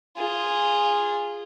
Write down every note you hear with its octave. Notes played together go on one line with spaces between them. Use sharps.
F4 G#4